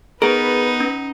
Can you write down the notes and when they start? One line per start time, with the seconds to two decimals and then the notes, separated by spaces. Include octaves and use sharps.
0.22 B3 D#4 G#4 A#4 B4
0.80 C#4